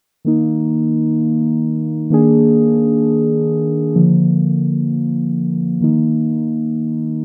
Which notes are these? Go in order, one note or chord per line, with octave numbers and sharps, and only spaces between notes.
D#3 A#3 D#4
D#3 A#3 D4 G#4
D3 F3 A#3
D#3 A#3 D#4